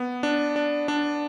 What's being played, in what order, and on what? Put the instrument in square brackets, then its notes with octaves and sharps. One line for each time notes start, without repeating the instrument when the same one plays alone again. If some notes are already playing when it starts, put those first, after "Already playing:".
Already playing: [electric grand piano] B3
D4
D4
D4